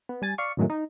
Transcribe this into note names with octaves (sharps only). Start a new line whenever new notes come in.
B3
G3 G#5 A6
D5 F5 C#6 C#7
F#2 A2 D#3 F#3 G#3 A3
D#4